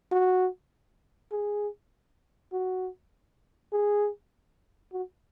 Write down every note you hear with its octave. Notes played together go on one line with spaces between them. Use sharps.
F#4
G#4
F#4
G#4
F#4